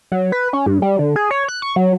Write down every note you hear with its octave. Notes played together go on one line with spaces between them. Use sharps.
F#3
B4
C#4
G2
G3
D3
G#4
C#5
F#6
C#6
F#3